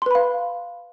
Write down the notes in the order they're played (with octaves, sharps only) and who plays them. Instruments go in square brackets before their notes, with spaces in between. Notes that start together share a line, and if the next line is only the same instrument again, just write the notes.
[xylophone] C6
B4
B5
F5